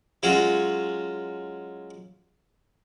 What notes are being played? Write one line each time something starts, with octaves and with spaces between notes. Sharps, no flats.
F#3 G#3 C#4 F4 F#4